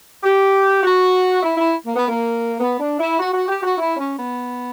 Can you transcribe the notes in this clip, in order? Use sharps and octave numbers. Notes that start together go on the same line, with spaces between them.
G4
F#4
E4
E4
A#3
B3
A#3
B3
D4
E4
F#4
F#4
G4
F#4
E4
C#4
B3